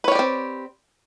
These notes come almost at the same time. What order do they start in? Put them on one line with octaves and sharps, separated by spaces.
B4 C#5 G4 D5 C4